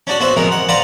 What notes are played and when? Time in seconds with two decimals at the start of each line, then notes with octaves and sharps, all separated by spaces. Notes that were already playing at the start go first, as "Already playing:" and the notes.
0.07 C#4 D4 F#4
0.20 B3 F#4 C5 E5
0.37 F2 B2 G#3 A#4
0.52 F#5
0.69 B4 C5 D5 F5 F#5 A#5